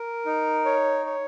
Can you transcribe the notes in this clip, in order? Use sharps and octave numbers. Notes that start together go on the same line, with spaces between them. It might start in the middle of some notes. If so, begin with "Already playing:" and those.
Already playing: A#4
D#4
C#5
C#5